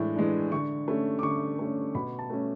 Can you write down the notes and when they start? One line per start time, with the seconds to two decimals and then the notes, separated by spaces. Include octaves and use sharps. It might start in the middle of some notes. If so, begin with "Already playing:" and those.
Already playing: A2 E3 G#3 D4
0.16 E3 G#3 D4
0.52 D3 C#6
0.88 A3 C#4
1.19 D6
1.23 D3 C#6
1.59 A3 C#4
1.95 B2 B5
2.19 A5
2.30 A3 C#4